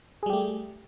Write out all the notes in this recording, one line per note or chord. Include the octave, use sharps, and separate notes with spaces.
G3 A3 G4 G#4